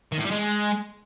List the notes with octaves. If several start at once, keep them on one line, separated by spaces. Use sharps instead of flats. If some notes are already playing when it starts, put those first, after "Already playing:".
D#3
A2
G3
G#3